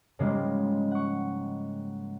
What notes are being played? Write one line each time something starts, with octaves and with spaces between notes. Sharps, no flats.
G#2 C#3 F3 G3 G#3 A#3
F#5 C#6